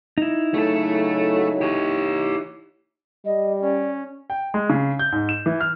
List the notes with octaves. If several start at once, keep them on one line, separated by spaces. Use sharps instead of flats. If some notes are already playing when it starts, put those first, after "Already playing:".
D#4 E4
A2 C#3 F#3 A3 A4
G4 C#5
G3 D#5
C#4 D5
G5
G#3
C#3
G6
G#2
E7
E3
F6